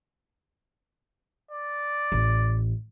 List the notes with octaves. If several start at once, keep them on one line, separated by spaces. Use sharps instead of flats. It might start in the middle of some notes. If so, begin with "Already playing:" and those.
D5
A1